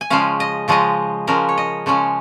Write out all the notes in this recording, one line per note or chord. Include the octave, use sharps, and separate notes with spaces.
G#5
C#3 F3 G#3 C#4 F5
D#5
C#3 F3 G#3 C#4 D#5
C#3 F3 G#3 C#4 A#4
C#5
D#5
C#3 F3 G#3 C#4 C#5